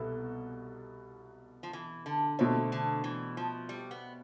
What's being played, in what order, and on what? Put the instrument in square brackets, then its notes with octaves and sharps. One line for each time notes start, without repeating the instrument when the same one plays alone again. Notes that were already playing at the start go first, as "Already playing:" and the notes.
Already playing: [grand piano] C2 B2 B3 E4 A4
[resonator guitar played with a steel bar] F3
E3
D3
[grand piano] B2 A3 C4 [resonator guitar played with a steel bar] D3
[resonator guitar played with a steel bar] D3
E3
F3
G3
B3